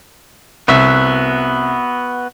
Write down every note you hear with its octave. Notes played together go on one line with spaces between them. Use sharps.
C2 B3 F#4 E5